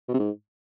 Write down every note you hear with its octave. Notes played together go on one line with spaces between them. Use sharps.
B2
C3
G#2